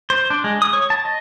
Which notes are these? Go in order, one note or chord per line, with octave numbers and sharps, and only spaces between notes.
C5
D4
G#3
D#6
C#5
A5
D#5